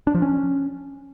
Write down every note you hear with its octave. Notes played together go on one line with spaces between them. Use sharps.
D4
F3
C#4